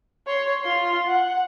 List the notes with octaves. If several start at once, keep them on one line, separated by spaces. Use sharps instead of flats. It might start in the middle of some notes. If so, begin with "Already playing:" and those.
C#5 C6
F4 C6
F#5